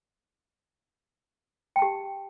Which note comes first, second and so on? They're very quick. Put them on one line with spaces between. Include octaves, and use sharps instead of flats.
G5 A5 G4